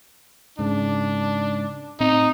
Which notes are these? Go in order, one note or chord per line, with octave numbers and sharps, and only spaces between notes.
G#2 C#3 D4
A2 C4 D#4